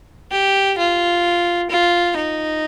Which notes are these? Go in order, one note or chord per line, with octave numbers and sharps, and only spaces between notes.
G4
F4
F4
D#4